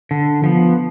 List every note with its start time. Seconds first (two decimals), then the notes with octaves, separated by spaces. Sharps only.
0.11 D3
0.44 F3 B3